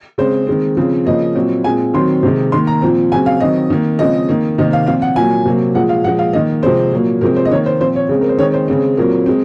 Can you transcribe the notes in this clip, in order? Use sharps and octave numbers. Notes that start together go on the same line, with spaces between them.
C#3 G#3 C4 C5
D#3 G#3 C4
C#3 F3 C4
C#3 F3 A#3 D#5
A#2 F#3 C4
A#2 G#3 C4 G#5
D#3 F#3 C4 C6
C3 D#3 G#3
D#3 A#3 C6
A#5
A#2 F3 C4
C#3 F#3 C4 G#5
F5
D#3 F#3 C4 D#5
D#3 A#3
C#3 F3 G#3 C4 D#5
D#3 A#3
C3 D#3 A#3 D#5
F5
A#2 F3 C4 F5
F#5
A#2 F#3 A#3 G#5
C3 F#3 A#3
A#2 F3 G#3 F#5
F5
A#2 F3 G#3 F#5
F5
D#3 A#3 D#5
C3 F3 G#3 C4 C5
A#2 F#3 A#3
C3 F3 G#3 C4 A#4
C5
D#5
D#3 A#3 C#5
C5
A#2 F3 C4 C5
C#5
C#3 G#3 C4
A#4
C5
D#3 G#3 C4 C#5
C5
C#3 G#3 C4
A#2 F#3 C4 A#4
G#3 C4